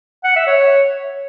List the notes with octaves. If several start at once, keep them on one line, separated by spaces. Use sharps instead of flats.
F#5
E5
C#5